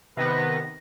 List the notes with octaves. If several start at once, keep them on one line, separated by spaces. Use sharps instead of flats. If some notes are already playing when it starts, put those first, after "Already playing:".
C3 D#3 B3 B4 A#6